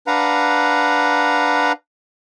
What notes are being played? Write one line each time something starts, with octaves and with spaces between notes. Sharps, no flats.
D4 B4 F5 F#5 A#5